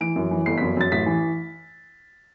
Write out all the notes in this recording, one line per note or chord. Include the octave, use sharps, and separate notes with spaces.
E3 D7
F#2
E3
G1 C7
F#2 B6
F#2 A6
A1 B6
E3